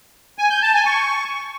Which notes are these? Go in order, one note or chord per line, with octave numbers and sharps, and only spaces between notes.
G#5
G6
A5
G#5
C#6